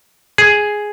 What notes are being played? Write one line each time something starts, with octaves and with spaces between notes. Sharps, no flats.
G#4